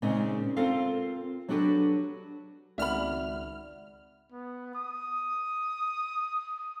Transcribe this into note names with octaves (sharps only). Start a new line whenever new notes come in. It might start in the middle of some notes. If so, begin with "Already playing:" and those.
A#2 C#3 G#3 C4 C#4 D#4
C4 F4 A4 A#4 F5
F#3 D4 F#4 G4 A4 B4
G#1 C#2 D5 E5 F#5 B5 F6
B3
D#6